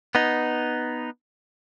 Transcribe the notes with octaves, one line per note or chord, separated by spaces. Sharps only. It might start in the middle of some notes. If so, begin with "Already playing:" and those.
B3 D#4